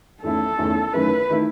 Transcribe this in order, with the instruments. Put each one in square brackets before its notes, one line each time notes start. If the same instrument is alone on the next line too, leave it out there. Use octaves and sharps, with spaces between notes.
[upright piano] E2 D#3 A3 C#4 E4 [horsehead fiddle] A4
[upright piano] E2 D#3 A3 C#4 E4
[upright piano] F#2 D#3 A3 E4 [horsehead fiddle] B4
[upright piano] D#3 A3 E4